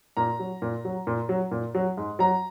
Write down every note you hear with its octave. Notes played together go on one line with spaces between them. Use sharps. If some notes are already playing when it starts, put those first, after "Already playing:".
A#2 A#5
F#3
A#2
F#3
A#2
F#3
A#2
F#3
G#2
F#3 A#5